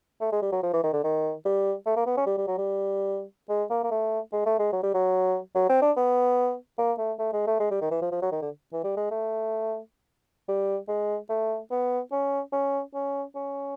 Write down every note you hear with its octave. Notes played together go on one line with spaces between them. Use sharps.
A3
G#3
G3
F#3
F3
E3
D#3
D3
D#3
G3
A3
A#3
B3
C#4
G3
G3
F#3
G3
G#3
A#3
A#3
A3
G#3
A3
G#3
F#3
G3
F#3
F#3
C4
D4
B3
A#3
A3
A3
G#3
A3
G#3
G3
D#3
E3
F3
F3
F#3
D#3
D3
E3
G3
G#3
A3
G3
G#3
A3
B3
C#4
C#4
C#4
C#4